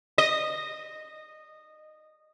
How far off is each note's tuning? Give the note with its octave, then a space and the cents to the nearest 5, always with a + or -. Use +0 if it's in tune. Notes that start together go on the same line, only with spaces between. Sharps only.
D#5 -15